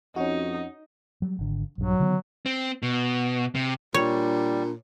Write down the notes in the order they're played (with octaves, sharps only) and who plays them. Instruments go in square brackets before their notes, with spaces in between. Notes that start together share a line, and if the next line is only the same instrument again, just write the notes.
[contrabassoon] F2 [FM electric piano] C#4 F#4 [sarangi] D#4
[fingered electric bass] F#3 G3
G#1 D3
[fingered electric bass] A#1 G2 [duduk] F#3
[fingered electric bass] D3 D#3 B3
[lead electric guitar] C4
B2
C3
[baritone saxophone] A#2 [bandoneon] G3 [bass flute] D4 [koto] C#5